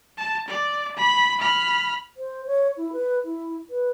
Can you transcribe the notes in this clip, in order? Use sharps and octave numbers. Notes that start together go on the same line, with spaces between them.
A5
D5
B5
B5 F6
C5
C#5
E4
B4
E4
B4